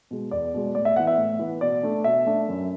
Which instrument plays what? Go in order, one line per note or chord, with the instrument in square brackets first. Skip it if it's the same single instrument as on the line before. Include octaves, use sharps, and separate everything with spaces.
[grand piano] B2 G#3
E2 D5
B2 G#3
A2 D5
E5
E3 B3 F#5
E5
A2
E3 B3
B2 D5
A3 D4
B2 E5
A3 D4
F#2